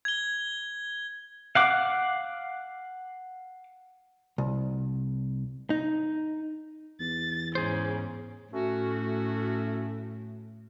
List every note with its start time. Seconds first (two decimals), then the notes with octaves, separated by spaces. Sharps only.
0.05 G#6 G7
1.55 F5 F#5 D6
4.38 C2
5.70 D#4
7.00 E2 A6
7.55 G#2 C#3 G#4 C5
8.53 A2 A3 C#4 F#4